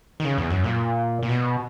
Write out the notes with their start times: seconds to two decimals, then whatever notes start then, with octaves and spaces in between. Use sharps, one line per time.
0.20 D#3
0.25 C#3
0.38 E2
0.50 F#2
0.64 A#2
1.23 A#2
1.29 B2